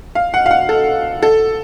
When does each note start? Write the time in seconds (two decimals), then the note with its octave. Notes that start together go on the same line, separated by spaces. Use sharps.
0.15 F5
0.34 F#5
0.46 F5
0.51 F#5
0.69 A4
1.23 A4